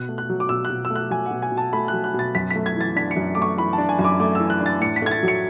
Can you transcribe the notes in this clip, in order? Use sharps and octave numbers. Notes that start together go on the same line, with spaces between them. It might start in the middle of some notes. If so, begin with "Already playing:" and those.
Already playing: B2 F#6
A3
F#6
F#3
D6
B2 E6
F#6
B2
E6
A3
F#6
F#3 G#5
F#5
B2
G#5
B2
A5
A3 B5
F#6
F#3
F#6
B2 A6
F#2 B6
B6
A3
G#6
E3 A6
D4 B6
C#7
F#2
A3 D6
C#6
E3 B5
A5
D4
G#5
F#2
D6
A3 D6
E3 E6
F#6
D4
A6
A2 C#7
B6
A3 G#6
A6
F#3
C#7